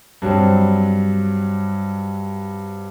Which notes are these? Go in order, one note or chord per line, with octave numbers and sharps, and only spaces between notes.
G2 F#3 G3 C4